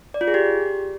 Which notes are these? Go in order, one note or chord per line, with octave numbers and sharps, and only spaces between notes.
D5
F4
G#4
G4